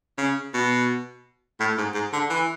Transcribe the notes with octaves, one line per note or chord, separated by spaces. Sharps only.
C#3
B2
A2
G#2
G#2
D3
E3